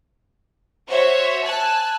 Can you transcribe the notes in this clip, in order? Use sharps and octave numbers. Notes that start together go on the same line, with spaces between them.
F#4 C5 C#5 E5
G#5 A5 E6 F#6